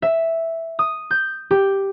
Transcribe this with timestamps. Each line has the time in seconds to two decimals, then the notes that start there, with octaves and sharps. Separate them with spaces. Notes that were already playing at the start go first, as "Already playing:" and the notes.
0.02 E5
0.79 D#6
1.11 G6
1.51 G4